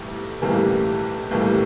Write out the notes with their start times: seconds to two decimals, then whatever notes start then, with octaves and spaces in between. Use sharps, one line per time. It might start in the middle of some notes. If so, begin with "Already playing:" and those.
Already playing: B1 A2 E3 G3
0.42 B1 A2 E3 G3 A#3
1.31 B1 A2 E3 G3 A#3